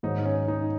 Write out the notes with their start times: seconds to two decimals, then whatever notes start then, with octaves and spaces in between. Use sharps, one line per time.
0.03 G#2 D#3 F#3 D#4
0.26 C#4
0.48 D#4